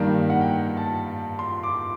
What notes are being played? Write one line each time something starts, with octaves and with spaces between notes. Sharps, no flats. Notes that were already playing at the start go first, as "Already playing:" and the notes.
Already playing: G2 D#3 G3 A#3
F#5
G5
A5
C6
D6